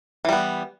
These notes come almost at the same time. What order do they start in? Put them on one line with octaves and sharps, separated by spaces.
E3 G3 B3